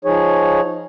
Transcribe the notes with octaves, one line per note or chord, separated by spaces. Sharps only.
F3 D#4 G#4 C#5